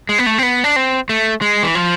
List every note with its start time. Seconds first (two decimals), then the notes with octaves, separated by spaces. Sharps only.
0.09 G#3
0.18 B3
0.26 A3
0.38 C4
0.43 B3
0.64 D4
0.76 C4
1.09 A3
1.42 G#3
1.63 E3
1.75 F3